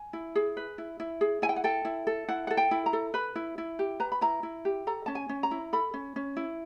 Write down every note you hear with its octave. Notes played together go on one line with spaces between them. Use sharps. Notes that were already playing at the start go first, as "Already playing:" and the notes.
Already playing: G#5
E4
G#4
B4
E4
E4
G#4
E4 G#5
G5
F#5
A4 G5
E4
A4
E4 F#5
A4 F#5
G5
E4
A#5
A4
B4 B5
E4
E4
G4
B4 A#5
B5
E4 A#5
E4
G4
A4 A#5
C#4 A5
G#5
C#4
A#5
E4
A4 B5
C#4
C#4
E4